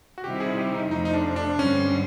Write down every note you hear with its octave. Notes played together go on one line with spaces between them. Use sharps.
F#4
C3 D#3 G3 C4 E4 G4
G#4
G4
D#4
F2 C3 F3 A3 D#4
D#4
D4
D4
G2 D3 G3 C4 C#4